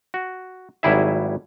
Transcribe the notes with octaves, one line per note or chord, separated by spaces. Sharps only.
F#4
G#1 F#3 G3 E4 G#4 E5